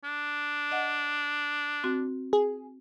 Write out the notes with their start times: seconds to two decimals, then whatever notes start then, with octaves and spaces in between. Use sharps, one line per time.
0.04 D4
0.71 D#5 F#5
1.84 C4 F#4
2.33 G#4